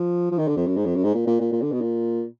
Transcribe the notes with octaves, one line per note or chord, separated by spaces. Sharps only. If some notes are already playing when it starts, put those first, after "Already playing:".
Already playing: F3
F3
D#3
D3
F2
F#2
G#2
F2
F#2
G#2
A#2
A#2
A#2
A#2
D3
B2
A#2